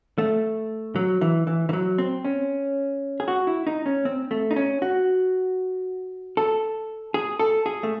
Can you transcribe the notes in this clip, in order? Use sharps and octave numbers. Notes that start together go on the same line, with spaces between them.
A3
F#3
E3
E3
E3
F#3
C4
C#4
G#4
F#4
E4
D#4
C#4
C4
A3
D#4
C#4
F#4
A4
G#4
A4
G#4
A3